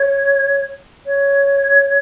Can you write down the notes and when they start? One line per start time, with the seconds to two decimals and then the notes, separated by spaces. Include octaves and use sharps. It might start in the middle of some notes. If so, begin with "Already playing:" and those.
Already playing: C#5
1.06 C#5